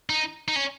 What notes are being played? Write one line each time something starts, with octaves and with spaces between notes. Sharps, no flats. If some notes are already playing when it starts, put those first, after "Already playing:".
D#4
D#4
C#4